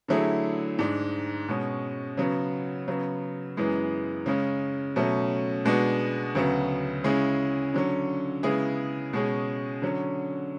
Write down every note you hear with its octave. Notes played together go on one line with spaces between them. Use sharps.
D3 F#3 A3 E4 G#4
G#2 G#3 D4
B2 G#3 C#4
C#3 F#3 B3
C#3 F#3 B3
F#2 E3 G#3 B3
C#3 G#3 C#4
B2 F#3 A3 C#4
B2 G#3 B3 D4 F#4
D2 C#3 F#3 B3
C#3 G#3 C#4 E4 G#4
D3 F#3 C#4
C#3 G#3 B3 E4 G#4
B2 G#3 C#4 G#4
D3 F#3 C#4